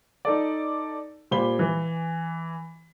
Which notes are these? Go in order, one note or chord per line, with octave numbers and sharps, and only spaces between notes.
D#4 A4 D5
A#2 G4 C5 B5 G7
E3